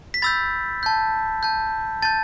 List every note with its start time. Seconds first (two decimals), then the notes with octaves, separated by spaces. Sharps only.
0.14 B6
0.22 B5 E6 G6 A6
0.83 A5 G6
1.43 A5 G6
2.02 A5 G6 A6